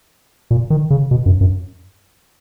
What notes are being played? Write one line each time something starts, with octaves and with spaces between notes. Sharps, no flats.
A#2
D#3
C#3
B2
F#2
F#2